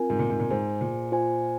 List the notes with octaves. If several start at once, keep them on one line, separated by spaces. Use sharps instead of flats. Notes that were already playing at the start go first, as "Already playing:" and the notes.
Already playing: C4 F4 A#4 G#5
G#2
A#2
G#2
A#2
G#2 G#4 C5 G#5
A#2
F4 C5 G#5